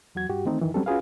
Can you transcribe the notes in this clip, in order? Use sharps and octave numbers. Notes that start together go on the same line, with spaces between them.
E2 F#3 F#4 G#6
G2 F#4 G4
D#3 E3 A3 C4 D#4
F#2 D#3 E3
F#3 G3 C4 C#4 G4 A4
C#4 F4 F#4 G#4 B4 F5